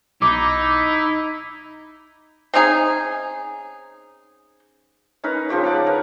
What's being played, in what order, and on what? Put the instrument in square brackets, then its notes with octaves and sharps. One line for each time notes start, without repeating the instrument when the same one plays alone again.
[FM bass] B1 [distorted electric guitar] D#4 [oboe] E4 [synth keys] D6
[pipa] C4 C#4 D#4 G#4
[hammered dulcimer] C#4 D#4 A#4 B4
C#3 F3 G4 C#6
D5 F#5 A#5
A#4 B4 C#5